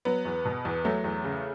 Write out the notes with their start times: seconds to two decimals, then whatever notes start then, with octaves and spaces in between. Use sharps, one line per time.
0.05 F#3 B3
0.25 E2
0.45 B2
0.65 E2
0.85 F#3 A3
1.04 E2
1.24 C#3